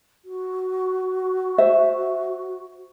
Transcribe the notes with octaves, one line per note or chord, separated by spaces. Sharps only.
F#4
C5 E5